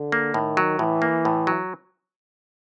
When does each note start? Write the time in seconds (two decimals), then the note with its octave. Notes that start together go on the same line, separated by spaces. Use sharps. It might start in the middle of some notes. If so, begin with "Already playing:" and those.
Already playing: D3
0.12 A#3
0.34 A2 D#3
0.57 F#3
0.79 A2 E3
1.02 A#3
1.25 A2
1.47 F#3